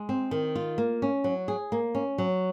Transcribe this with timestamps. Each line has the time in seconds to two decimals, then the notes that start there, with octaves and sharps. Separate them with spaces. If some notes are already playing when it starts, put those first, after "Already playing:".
Already playing: G#3
0.09 C4
0.31 D#3
0.55 F4
0.78 A#3
1.02 C#4
1.24 F#3
1.48 G#4
1.72 A#3
1.95 C#4
2.18 F#3